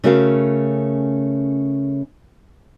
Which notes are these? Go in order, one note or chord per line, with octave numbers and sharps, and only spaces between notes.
C#3 A3 C#4 F#4 A#4 F5